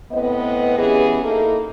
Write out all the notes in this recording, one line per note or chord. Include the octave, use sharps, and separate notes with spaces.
A2 B3 C4 B4 D#5
E3 B3 C#4 G4 G#4
A#3 D#4 E4 A4